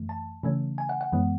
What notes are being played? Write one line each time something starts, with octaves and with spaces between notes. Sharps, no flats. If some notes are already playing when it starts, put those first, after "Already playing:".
Already playing: F#2 E3 A3
A5
C#3 E3 A3 C#4
G#5
F#5
F#5
F#2 E3 G#3 B3